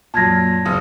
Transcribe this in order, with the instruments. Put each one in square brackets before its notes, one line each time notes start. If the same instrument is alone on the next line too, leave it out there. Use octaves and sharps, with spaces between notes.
[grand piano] F#2 A#2 [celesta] A5 G#6 A#6
[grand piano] F#1 D#6